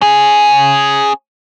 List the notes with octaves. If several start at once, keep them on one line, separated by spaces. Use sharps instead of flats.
C#4 G#4